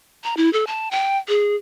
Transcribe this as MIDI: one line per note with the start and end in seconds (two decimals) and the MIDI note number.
0.24 0.37 82
0.37 0.52 64
0.53 0.65 69
0.67 0.91 81
0.91 1.18 79
1.28 1.55 68